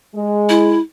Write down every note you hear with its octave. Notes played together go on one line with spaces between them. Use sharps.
G#3
E4